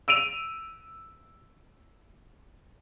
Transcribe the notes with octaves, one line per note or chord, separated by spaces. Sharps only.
E6 D7 D#7 F7